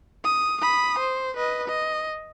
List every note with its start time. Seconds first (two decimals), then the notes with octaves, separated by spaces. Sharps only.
0.25 D#6
0.61 B5 D#6
0.98 C5
1.36 B4 D#5
1.68 D#5